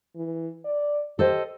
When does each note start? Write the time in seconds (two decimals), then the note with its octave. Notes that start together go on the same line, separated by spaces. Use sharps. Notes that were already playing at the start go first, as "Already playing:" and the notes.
0.16 E3
0.65 D5
1.19 G4 A4 C5 D#5